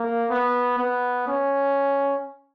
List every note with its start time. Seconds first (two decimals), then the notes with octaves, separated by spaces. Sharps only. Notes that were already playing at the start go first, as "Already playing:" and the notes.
Already playing: A#3
0.30 B3
0.79 B3
1.28 C#4